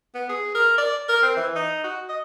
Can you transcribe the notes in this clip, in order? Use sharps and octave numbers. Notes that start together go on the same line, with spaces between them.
B3
G#4
A#4
D5
A#4
C4
E3
D#4
F#4
D#5